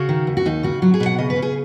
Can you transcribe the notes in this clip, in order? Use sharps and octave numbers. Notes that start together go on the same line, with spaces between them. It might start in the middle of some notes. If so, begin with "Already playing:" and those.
Already playing: C#3 F#4
D#3
D#2
F#4
D#2 D#4
C#3 F#4
F#3 F#4
G#4
B2
F#5
C#3 D#5
B4
C#3
G#4